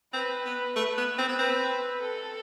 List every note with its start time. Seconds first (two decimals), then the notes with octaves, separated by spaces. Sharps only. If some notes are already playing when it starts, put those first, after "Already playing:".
0.13 C4 B4
0.45 B3
0.76 A3 B4
0.98 B3
1.18 C4
1.29 B3
1.39 C4 B4
2.03 A4